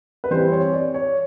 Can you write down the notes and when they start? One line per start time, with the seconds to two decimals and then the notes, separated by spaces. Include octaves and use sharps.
0.24 B4
0.31 E3 G3 C4 C5
0.52 C#5
0.73 D5
0.94 C#5